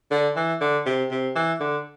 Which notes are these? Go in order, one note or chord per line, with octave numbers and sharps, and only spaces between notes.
D3
E3
D3
C3
C3
E3
D3